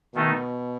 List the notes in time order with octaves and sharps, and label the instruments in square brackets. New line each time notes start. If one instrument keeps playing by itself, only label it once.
[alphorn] B2 [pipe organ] D#3 A3 D#4